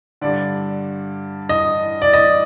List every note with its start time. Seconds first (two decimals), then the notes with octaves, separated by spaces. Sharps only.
0.21 G2 D3 D5
1.49 D#5
2.02 D5
2.13 D#5